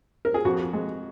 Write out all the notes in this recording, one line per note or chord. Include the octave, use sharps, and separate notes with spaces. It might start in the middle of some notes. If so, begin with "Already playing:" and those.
A#4
G#4
F2 F#4
G#3